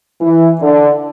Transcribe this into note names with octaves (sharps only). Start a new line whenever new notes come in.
E3
D3